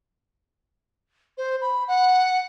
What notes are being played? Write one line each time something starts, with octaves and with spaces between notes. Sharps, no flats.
C5
B5
F#5